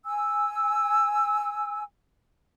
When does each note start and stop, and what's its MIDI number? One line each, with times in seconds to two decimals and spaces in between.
0.05 1.83 80
0.05 1.83 88